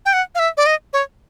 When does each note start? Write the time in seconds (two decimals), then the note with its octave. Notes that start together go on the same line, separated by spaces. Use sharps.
0.06 G5
0.13 F#5
0.35 F5
0.39 E5
0.57 D5
0.66 D#5
0.93 C#5